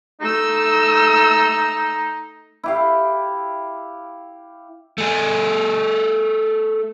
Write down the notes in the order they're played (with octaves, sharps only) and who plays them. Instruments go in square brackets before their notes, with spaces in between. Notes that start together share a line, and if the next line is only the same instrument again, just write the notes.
[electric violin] A3 E6 [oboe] D#4
[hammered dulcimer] E4 G4 F5
[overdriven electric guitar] A3 G#4